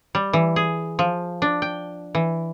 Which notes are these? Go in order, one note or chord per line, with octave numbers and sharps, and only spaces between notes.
G3
E3
G#4
F3
D4
G5
E3